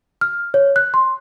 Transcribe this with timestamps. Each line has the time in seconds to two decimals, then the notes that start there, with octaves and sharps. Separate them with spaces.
0.21 F6
0.54 C#5
0.76 F#6
0.94 C6